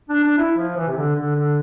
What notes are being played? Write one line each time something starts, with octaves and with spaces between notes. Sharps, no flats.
D4
D4
E4
F3
E3
C3
D3
D3
D3